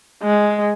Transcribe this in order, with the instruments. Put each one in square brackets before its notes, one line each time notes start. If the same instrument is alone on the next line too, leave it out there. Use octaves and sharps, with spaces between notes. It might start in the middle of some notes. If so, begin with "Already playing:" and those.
[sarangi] G#3